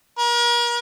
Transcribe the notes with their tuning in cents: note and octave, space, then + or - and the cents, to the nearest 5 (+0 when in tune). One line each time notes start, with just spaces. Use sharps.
A#4 +40